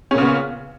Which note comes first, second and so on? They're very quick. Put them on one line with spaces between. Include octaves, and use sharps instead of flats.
C#4 A#2 C#3 B3